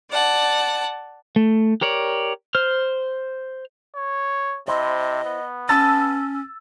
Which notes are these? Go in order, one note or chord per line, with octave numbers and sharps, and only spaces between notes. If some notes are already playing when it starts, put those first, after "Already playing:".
D5 F#5 A5
A3
G4 A#4 C#5 D5
C5 F6
C#5
C3 E4 C5 D#5
B3
C#4 A5 E6 A6